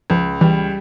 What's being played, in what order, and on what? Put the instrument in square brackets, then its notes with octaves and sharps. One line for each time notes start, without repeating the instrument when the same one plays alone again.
[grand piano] C#2 [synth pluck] F3
[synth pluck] E3 [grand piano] G3